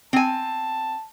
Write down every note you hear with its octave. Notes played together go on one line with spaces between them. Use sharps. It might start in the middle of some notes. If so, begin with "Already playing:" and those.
C4 G#5 A5